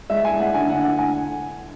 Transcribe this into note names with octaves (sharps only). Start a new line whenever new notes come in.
G#3 E5
G#5
G#3
F#5
D3 G#5
F#5
D3
F#5
G#5